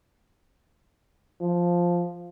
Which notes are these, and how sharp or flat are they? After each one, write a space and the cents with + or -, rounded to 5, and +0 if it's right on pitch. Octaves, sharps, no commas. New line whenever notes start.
F3 +0